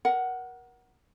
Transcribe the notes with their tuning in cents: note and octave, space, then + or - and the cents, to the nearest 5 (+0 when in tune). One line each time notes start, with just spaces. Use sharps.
A#4 +30 F#5 +10